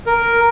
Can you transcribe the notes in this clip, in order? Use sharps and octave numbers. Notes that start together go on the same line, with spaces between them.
A#4